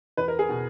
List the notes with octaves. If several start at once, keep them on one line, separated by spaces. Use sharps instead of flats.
E2 B4
A#4
G#4
B2